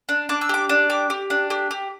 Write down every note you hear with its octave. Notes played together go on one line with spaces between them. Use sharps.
D4
D4 D6
E6
G4 D6
D4
G4 D6
G4
D4
G4
G4